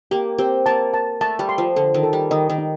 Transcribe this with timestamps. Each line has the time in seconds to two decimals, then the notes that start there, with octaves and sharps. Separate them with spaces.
0.11 A#3 G4
0.38 C4 G4
0.66 A#3 A5
0.94 A5
1.21 A3 A5
1.39 G3
1.49 C6
1.58 F3
1.76 D3 A4
1.94 D#3
2.03 A4
2.13 G3
2.31 D#3 D#5
2.50 D#3
2.58 D#4